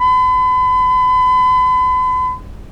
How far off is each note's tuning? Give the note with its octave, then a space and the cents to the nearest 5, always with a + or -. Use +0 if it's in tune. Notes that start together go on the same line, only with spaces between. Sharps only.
B5 +40